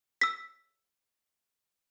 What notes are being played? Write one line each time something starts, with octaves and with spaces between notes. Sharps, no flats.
E6 B6